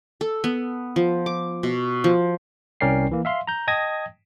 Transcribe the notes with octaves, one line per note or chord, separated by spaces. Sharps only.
A4
B3
F3
D6
B2
F3
C2 C#4 A#4 D5 G5 C7
E3 A#3
E5 F5 C6
A#5 G6
D#5 G5 A5 D#6 G#6 A#6